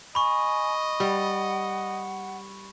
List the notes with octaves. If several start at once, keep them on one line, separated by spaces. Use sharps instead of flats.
D#5 G#5 B5 C#6
G3 F#5